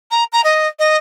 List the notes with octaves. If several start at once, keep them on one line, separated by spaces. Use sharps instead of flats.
A#5
A#5
D#5
D#5